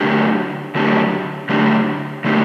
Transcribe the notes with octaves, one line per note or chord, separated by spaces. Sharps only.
D3 F#3 A3 D4 G4
D3 F#3 A3 D4 G4
D3 F#3 A3 D4 G4
D3 F#3 A3 D4 G4